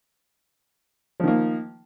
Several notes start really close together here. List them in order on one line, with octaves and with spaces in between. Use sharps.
F3 D#3 A#3